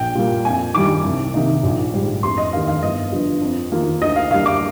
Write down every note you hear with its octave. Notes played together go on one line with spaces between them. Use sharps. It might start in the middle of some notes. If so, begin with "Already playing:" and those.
Already playing: A#1 G5
A#2 G3 A#3
F2 G#5
D#3 G3 D6
C2
C3 D#3 A#3 D#4
A#1
G#2 G3
F1 C6
D#5
D#2 D#3 A#3 F5
F5
G1 D#5
G2 D3 F3
F2
D#3 A#3 F4
D2 D#5
F5
D3 G3 A#3 F5
D6